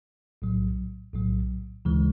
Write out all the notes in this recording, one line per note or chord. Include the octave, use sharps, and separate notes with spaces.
B1 A2 F#3
B1 A2 F#3
D2 C#3 E3 G#3